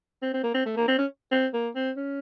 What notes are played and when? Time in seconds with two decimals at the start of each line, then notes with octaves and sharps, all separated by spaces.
0.22 C4
0.34 C4
0.43 A#3
0.54 C4
0.66 A3
0.77 A#3
0.88 C4
0.98 C#4
1.31 C4
1.54 A#3
1.75 C4
1.97 C#4